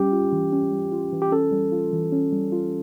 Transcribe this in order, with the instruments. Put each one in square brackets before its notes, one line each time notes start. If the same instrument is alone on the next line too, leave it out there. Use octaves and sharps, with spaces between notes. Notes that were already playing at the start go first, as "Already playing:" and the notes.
Already playing: [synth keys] G3 C#4 [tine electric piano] G4
[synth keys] F4
E3
C#4
G3
F4
E3
[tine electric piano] G4
[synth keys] C#4 [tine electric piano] A4
[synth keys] G3
F4
E3
C#4
G3
F4